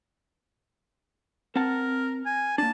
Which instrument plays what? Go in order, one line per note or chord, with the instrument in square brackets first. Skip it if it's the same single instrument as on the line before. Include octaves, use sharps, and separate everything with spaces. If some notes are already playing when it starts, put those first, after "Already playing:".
[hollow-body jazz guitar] C4 F#5 A5 [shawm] A#4
[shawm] G#5
[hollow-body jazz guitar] A#3 D4 [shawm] A5